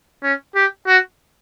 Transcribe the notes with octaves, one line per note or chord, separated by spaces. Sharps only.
C#4
G4
F#4